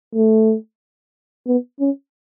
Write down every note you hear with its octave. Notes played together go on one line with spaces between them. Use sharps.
A3
B3
C#4